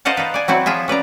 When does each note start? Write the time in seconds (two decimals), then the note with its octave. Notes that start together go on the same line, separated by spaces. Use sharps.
0.05 A#4 C5 D#5 F5 F#5 A5
0.17 D#4 F4 B4
0.34 D5 G#5
0.48 F#3 C4 E4 F#4 G4
0.66 F3 F4 G#4 E5
0.88 C#4 B4 D5 A#5